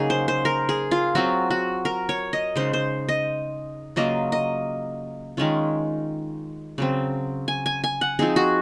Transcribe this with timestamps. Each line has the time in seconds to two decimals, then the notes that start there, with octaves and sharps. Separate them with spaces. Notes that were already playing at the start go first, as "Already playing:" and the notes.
Already playing: C#3 F#3 A#3 D#4 G#4 A#4
0.10 C5
0.28 C5
0.45 A#4
0.69 G#4
0.91 F4
1.15 F#3 C4 F4 F#4
1.51 F#4
1.85 A#4
2.09 C#5
2.33 D#5
2.56 C#3 G#3 D#4 C5
2.73 C5
3.09 D#5
3.96 C#3 F#3 A#3 F4 D#5
4.32 D#5
5.37 D#3 G#3 C#4 F4
6.78 C#3 F#3 C4
7.48 G#5
7.66 G#5
7.84 G#5
8.01 F#5
8.19 F3 C4 D#4 G#4
8.36 F#4